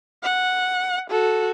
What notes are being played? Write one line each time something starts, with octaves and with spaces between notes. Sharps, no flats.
F#5
F#4 A4